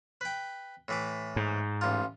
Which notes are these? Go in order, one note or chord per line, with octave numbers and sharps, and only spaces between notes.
B4 G5
A2 E3 D6
G#2
A1 F4